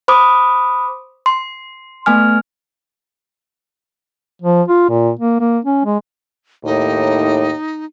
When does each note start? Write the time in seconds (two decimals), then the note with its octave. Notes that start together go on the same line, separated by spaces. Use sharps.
0.08 C5 B5 D6 D#6
1.26 C6
2.06 A3 B3 G#5 F6
4.42 F3
4.69 F4
4.90 A#2
5.19 A#3
5.41 A#3
5.65 C#4
5.85 G#3
6.65 D#2 A2 D#4